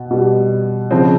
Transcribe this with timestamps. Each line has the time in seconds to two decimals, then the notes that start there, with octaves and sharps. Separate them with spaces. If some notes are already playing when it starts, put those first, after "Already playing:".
Already playing: B2
0.11 B2 G3
0.91 C#3 F3 C4